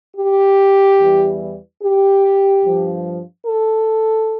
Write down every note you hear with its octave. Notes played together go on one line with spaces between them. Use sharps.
G4
E2 E3 G3
G4
G2 F3
A4